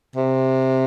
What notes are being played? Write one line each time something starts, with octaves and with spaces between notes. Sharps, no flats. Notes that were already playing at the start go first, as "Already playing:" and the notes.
C3